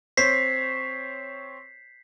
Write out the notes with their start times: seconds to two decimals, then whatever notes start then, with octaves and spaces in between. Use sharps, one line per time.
0.17 C4 C5 C#5 B6 C7